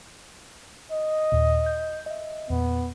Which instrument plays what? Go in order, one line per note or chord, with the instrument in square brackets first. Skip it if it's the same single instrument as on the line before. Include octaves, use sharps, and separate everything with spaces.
[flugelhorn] D#5
[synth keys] D#2 A#2
G6
D#5 E5
[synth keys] E2 A#2 [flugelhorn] B3